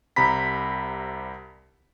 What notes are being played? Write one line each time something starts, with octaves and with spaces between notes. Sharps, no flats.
C2 C3 A#5 B5 B6